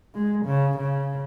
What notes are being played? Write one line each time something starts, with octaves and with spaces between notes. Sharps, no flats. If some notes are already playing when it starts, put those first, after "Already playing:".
G#3
C#3
C#3